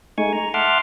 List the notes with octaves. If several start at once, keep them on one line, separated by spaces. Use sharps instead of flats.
G#3 A3 D#4 G#5 C#6
A#5
E5 F#5 A5 C6 D6 F6